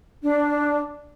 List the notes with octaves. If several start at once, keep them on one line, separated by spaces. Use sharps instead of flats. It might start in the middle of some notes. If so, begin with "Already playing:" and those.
D4